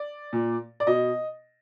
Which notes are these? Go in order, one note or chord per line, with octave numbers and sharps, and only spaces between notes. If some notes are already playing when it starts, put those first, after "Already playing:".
Already playing: D5
A#2
D5
B2 D#5